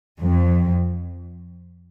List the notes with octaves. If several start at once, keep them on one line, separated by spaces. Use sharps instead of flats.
F2